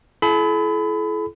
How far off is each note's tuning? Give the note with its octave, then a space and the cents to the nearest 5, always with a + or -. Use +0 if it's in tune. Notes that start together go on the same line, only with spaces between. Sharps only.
E4 +35 A4 -45 B5 +25